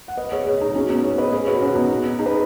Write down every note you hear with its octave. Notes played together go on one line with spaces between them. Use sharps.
F#5
B4 D#5
G#4 C#5
G#4 C#5
D#4 G#4
C#4 F#4
B3 D#4
G#4 C#5
B4 D#5
G#4 C#5
F#4 B4
C#4 F#4
B3 D#4
D#4 G#4
B4